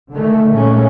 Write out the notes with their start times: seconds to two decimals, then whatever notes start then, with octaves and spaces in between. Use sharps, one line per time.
0.13 D3 D#3 G#3 A3
0.52 A#2 G#3 A3 C#4